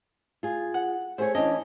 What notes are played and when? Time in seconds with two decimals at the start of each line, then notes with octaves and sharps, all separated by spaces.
0.43 F4 G#4
0.74 F#5
1.18 A3 G#4 C5 C#5
1.35 E3 C#4 D4 D#5